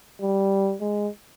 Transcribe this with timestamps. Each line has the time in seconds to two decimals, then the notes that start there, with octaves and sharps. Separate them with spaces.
0.22 G3
0.81 G#3